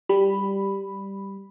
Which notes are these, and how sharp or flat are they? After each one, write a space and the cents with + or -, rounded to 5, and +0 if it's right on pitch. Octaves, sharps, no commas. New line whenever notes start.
G3 +0 B5 +0